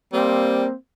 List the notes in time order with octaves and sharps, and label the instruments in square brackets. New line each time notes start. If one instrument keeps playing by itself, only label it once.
[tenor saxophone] G3 [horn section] A#3 C4